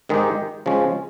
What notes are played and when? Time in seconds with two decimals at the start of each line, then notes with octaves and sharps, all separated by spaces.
0.09 G#2 D#3 G#3 D#4 G4
0.66 C#3 F3 G#3 C#4